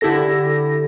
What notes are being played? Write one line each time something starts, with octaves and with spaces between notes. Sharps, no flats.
D3 E4 G4 A4 A#6